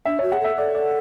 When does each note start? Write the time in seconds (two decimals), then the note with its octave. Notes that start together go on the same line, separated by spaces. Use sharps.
0.05 D4 E5
0.19 F#4 C#5
0.32 G#4 F#5
0.40 A4 E5
0.57 A4 D5
0.75 D5